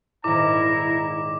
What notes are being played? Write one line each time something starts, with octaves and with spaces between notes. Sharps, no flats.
D#1 G#2 E4 A#5 D6